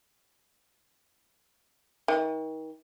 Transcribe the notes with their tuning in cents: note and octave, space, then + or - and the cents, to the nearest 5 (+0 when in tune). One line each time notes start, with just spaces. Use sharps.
D#3 +35